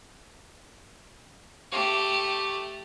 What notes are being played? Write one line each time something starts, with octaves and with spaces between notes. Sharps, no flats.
A3 G4